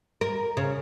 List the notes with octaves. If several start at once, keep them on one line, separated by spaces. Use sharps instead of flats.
A#4
C#3